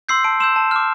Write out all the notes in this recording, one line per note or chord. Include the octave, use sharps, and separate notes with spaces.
C6 E6 G6 C7
A5 D7
C6 E6 G6 E7
A5
D6 F6